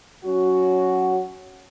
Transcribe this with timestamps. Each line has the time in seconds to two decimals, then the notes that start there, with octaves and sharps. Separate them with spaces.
0.25 F#3 C#4 F#4